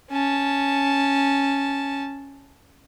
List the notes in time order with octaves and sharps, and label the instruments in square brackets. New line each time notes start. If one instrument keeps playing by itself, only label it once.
[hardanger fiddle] C#4 A5